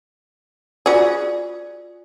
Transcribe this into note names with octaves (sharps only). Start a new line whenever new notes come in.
F4 F#4 G#4 D5